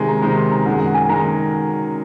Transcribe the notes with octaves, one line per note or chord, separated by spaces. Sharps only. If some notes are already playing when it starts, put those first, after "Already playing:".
Already playing: C3 D#3 G#3 G#5
A#5
C3 D#3 G#3 A#5
C6
A#5
F#2 D#3 G#3 F#5
F#5
G#5
D#3 G#3 A#5